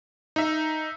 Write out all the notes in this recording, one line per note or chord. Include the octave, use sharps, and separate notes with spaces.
D#4 E5